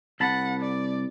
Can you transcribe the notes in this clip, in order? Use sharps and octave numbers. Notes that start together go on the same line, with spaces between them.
C2 F#5 A5 B5
D5